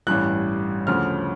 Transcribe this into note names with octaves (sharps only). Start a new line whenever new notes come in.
A1 G2 E3 F#6
D2 C#3 F3 F6